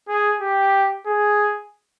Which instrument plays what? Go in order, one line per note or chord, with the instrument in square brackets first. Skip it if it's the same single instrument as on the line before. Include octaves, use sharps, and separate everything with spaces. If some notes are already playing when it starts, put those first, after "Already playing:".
[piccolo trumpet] G#4
G4
G#4